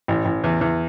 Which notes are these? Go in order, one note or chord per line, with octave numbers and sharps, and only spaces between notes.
A1
A1
E2
E2